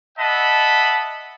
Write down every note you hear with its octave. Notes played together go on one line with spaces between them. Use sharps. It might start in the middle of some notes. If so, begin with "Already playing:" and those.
D#5 E5 F#5 A5 B5